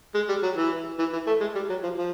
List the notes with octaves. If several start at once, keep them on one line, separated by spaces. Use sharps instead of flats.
G#3
G3
F#3
E3
E3
E3
A3
G#3
G3
F#3
F3
F3